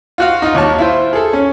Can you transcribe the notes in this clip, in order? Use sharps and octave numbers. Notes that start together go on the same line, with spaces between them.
F4 F#4 F5
D#4 F4
D#2 C#5 A5
E4 F4 C5
G#4 A4
C#4